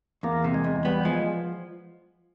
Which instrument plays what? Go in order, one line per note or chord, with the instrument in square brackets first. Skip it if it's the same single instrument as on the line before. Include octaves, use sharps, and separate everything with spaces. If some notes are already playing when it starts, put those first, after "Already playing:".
[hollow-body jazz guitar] E2 [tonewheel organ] A#3
[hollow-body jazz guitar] C3
[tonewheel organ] G#3
[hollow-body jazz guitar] E2
[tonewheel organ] G3 [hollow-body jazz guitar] B3
[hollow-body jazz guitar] F3 [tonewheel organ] G#3